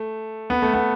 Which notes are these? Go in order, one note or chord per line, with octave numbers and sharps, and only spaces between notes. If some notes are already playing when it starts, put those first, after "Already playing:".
Already playing: A3
B3
A3
B3